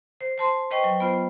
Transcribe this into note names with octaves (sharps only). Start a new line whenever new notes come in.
C5
C5 A5 C6
B4 C5 D#5 G5 C#6
F#3
B3 F4 C5